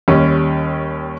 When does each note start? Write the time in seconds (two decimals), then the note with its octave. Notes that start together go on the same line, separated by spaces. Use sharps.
0.08 D#2 G3 C#4